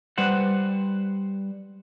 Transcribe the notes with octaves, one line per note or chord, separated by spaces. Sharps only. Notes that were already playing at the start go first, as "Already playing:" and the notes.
G3 B4 C5 F#5